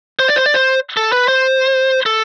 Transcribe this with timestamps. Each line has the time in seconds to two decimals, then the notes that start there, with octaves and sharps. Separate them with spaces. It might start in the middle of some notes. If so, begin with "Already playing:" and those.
0.19 C5
0.28 D5
0.36 C5
0.46 D5
0.54 C5
0.97 A4
1.12 B4
1.28 C5
2.06 A4